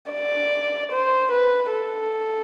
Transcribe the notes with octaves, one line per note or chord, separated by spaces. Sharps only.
D5
C5
B4
A4